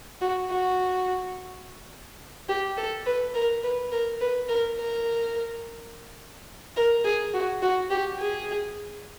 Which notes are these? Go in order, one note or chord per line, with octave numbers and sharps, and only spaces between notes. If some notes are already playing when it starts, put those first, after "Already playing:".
F#4
F#4
G4
A4
B4
A#4
B4
A#4
B4
A#4
A#4
A#4
G#4
F#4
F#4
G4
G#4